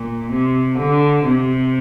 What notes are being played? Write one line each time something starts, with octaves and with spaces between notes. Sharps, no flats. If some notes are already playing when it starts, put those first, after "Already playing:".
Already playing: A#2
C3
D3
C3